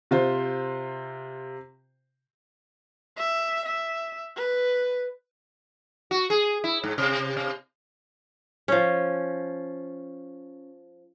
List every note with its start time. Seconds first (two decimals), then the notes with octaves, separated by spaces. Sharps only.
0.11 C3 F4 C5
3.17 E5
3.66 E5
4.36 B4
6.11 F#4
6.30 G#4
6.64 E4
6.84 G#2
6.98 C3
7.37 C3
8.68 F3 C#4